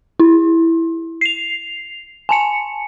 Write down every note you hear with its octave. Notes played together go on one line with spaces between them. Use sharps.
E4
C7 F7
G#5 A5 C#7